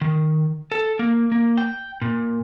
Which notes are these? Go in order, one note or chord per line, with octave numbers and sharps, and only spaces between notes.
D#3
A4
A#3
A#3
G5
A#2